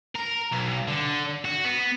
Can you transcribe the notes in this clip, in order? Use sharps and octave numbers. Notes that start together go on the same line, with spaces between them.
A#4
B1
D3
F#4
B3